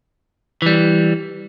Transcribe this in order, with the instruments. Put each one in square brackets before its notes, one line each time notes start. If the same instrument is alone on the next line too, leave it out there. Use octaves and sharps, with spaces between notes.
[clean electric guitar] E3 G3